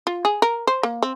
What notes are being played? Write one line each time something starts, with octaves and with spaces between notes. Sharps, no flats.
F4
G#4
A#4
C5
A#3
C4